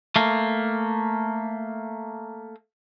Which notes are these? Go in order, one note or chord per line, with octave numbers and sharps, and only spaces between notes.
A3 A#3